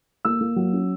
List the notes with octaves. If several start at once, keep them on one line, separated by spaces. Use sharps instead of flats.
A#3 E6
A#3
F#3
C#4